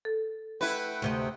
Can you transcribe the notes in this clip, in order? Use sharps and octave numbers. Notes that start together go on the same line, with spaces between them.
A4
A3 E4 B4 F#5 G5
D2 C3 D#5